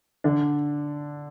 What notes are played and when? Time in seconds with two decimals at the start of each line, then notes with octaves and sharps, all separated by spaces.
0.24 D3 D4